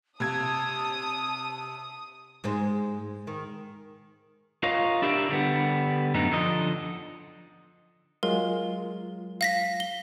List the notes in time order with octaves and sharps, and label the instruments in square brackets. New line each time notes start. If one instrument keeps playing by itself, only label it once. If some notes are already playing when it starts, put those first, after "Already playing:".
[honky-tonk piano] C3 G#6 [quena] A5 [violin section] D#6
[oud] G#2 G#3 C5
D#3
[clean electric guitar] F4 A#4 C#5 D#5 F5
D4 E4 G4 A#4 D5
D3 G3 B3
F#2 A2 D3 B3 D#4
D3 F3 D#5
[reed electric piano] F#3 G#3 F4 [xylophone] A#4
[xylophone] F5 A#6 B6
G7